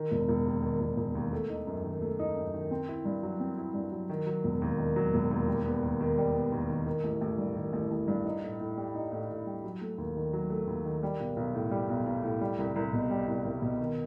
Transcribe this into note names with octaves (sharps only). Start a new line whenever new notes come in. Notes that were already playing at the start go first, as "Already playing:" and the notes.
Already playing: D#3
E1
E1
D#2
D#3
E1
E1
D#2
A3
D#4
F#2
D#3
A3
D#4
F#2
D#3
C4
E4
G2
F#3
C4
E4
G2
F#3
D#3
F#3
E1
D#2
D#3
F#3
E1
D#2
G3
B3
D#2
D#3
G3
B3
D#2
D#3
D#3
A1
A1
G2
D#3
A1
A1
G2
D#4
A2
A2
G3
D#4
A2
A2
G3
F#3
A3
D#2
D#3
F#3
A3
D#2
D#3
G3
B1
B1
A2
G3
B1
B1
A2
G3
C2
C2
B2
G3
C2
C2
B2
D#3